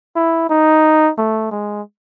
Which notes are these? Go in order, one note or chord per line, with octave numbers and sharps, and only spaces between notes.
E4
D#4
A3
G#3